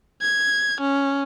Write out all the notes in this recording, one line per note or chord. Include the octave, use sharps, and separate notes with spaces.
G#6
C#4